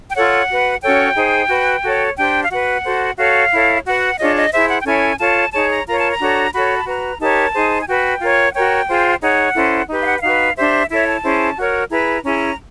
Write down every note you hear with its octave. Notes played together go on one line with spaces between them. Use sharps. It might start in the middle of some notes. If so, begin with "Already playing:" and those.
G5
F4 A4 C#5 F#5
F#4 B4
C#4 F#4 A4 C#5 G5
D#4 G#4 C5
F#4 B4
F#4 A4 C#5
D4 G4 C5 G5
F5
F#4 B4 F#5
F#4 A4 C5
F#4 A4 C#5 F5
E4 A4 C#5
F#4 B4 F#5
D4 F4 G#4 C#5 D#5
D#5
E4 G#4 C5 E5
F#5
G5
C#4 E4 A4 C#5 G#5
F4 A4 C#5 A5
D#4 G#4 C#5 A5
A#5
F4 A#4 C#5 A#5
A5
A#5
D4 F#4 A4 C#5
F#4 A4 C#5 B5
A5
F#4 B4 A#5
D#4 G4 A#4 C#5 A5
D#4 G#4 C5
G#5
F#4 B4 G5
F4 A#4 C#5
F#5
F#4 A#4 C#5 G5
F4 G#4 C5
D#4 G#4 C#5 F#5
C#4 E4 A4 C5
D#4 G4 B4
F5
F#5
F#5
D#4 F#4 B4 F5
D4 G4 C5 E5
E4 A4 C#5 E5
A5
C#4 E4 G#4 C5
F#4 A#4 C#5
E4 G#4 B4 A#5
C#4 E4 G#4 A#5